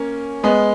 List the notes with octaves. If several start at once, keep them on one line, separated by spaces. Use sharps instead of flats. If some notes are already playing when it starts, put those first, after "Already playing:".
Already playing: A#3 C#4
G#3 B3